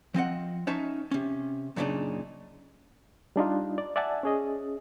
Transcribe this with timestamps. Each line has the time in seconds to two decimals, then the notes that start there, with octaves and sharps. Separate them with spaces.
0.14 F3 C4 D#5 F#5
0.67 C#4 D#4 C#5 E5 A5
1.11 C3 C#4
1.76 F#2 A#2 C#3 A3 D4 D#4
3.36 G3 D4 D#4 F4
3.78 D5
3.96 D5 E5 F#5 G#5 A5
4.23 C#4 G#4 D#5